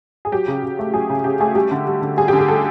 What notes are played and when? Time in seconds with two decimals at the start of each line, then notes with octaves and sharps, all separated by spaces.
0.25 G#4
0.32 F#3 G4
0.48 C#3
0.64 C#3
0.79 A3
0.93 F#3 G#4
1.10 C#3
1.24 C#3 G4
1.40 A3 G#4
1.55 G3 G4
1.71 D3
1.87 G3
2.02 D3
2.17 G3 G#4
2.28 G4
2.33 D3
2.38 G#4
2.48 G3 A4